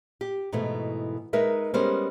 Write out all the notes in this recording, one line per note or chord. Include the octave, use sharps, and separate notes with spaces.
G4
G#2 B2 E3 A3 B3
G#3 D#4 A#4 B4 E5
G3 G#3 B3 C#4 A#4 C5